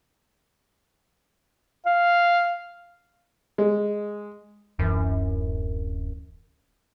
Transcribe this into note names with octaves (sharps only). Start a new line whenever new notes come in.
F5
G#3
D1 F#2 E3